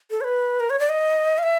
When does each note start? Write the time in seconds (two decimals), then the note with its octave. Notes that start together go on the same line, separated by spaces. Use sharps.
0.11 A4
0.21 C#5
0.24 B4
0.60 A#4
0.70 C#5
0.79 D5
0.89 D#5
1.38 F5
1.43 E5